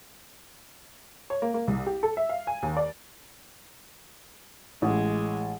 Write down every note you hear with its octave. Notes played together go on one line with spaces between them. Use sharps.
C#5
A#3
A#3
C2
G4
A4
E5
F5
G#5
D#2
D5
A1 G#3